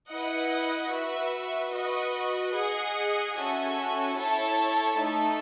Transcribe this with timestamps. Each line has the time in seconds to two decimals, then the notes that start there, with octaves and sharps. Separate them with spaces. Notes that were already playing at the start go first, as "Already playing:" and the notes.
0.09 E4 B4 D#5 F#5
0.90 F#4 B4 E5
1.73 F#4 B4 D#5
2.55 G#4 D#5 F#5
3.36 C#4 F#4 A4 E5 G#5
4.18 E4 A4 C#5 E5 A5
4.99 A3 D#4 A4 E5